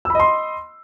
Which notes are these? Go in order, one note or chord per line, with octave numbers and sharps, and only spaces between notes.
D#5 B5 C6 E6